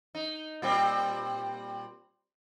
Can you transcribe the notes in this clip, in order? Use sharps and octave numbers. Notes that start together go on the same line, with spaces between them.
D#4
A#2 G3 C4